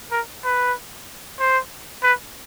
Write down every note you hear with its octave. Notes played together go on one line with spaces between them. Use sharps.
A#4
B4
C5
B4